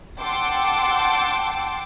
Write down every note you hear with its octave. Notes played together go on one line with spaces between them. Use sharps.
F#5 G5 A5 C6 D6 E6